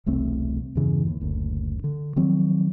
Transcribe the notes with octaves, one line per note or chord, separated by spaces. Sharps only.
E1 C2 A3 C4
E2 G2 C#3 E3
D#2
F#1 D2
D3
D#3 F3 F#3 C4